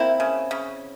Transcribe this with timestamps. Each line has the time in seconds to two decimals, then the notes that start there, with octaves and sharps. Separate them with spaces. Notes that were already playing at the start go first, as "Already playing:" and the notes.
Already playing: A#3 C4 E4
0.20 C#3
0.51 C#3